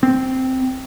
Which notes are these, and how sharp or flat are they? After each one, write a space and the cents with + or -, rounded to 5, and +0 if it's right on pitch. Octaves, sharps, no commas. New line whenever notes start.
C4 -5